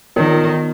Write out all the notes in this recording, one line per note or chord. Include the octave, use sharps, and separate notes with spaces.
D#3 B3 F4 A#4 C#5